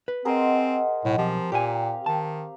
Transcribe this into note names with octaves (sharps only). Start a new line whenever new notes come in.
B4
C4 G#4 A#4 C5 D#5 F#5
B1 A2
F3 C4 G4
A#2 G4 F5 G5 G#5
D#3 A5